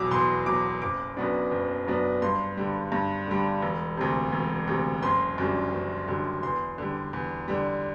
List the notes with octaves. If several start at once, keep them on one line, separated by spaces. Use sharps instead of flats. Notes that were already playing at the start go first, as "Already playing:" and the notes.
Already playing: E2 B2 F#3 D6 E6
E2 C6
B2 F#3 D6
F#1 D6
F#2 F#3 B3 D4
F#1
F#2 F#3 B3 D4
G2 C6
D3 G3
G2
D3 G3
E1
D2 C3
E1
D2 C3
F#1 C6
F#2 D3 G3
F#1
F#2 D3 G3
E2 C6
D3 G3
E2
D3 G3